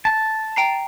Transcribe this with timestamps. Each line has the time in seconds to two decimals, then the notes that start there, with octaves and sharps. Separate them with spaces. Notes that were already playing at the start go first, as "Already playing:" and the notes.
0.05 A5
0.56 G5 A#5 C7